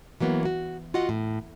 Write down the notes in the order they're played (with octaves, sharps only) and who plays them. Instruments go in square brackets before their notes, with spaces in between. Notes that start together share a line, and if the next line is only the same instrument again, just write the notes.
[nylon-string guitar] E3 F#3 A#3 B3
F#4
F4 F#4 D#5 F#5
A2